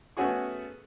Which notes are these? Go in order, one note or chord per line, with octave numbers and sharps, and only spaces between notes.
A3 B3 C#4 F#4 G#4 C#6